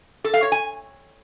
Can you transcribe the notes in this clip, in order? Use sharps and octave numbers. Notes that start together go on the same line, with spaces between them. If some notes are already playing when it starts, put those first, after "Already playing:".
A4
F5
C#5
G#5